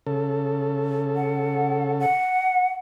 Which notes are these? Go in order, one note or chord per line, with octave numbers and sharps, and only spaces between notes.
C#3 A4
F#5
F#5